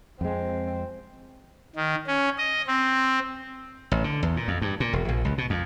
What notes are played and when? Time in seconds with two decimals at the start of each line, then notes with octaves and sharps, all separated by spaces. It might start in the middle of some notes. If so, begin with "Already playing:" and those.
0.21 F2 G#3 C4
1.76 D#3
2.07 C#4
2.38 D#5
2.67 C4
3.92 A1
4.04 D3
4.23 E2
4.37 A#2
4.48 F2
4.62 G2
4.80 A#2
4.93 E1
5.09 A#1
5.25 C#2
5.38 B2
5.50 F2